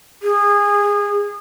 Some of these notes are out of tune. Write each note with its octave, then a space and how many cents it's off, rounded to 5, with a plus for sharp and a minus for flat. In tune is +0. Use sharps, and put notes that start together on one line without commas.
G#4 -25